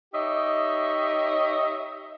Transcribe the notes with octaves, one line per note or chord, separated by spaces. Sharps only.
D#4 G4 C#5 D#5 E5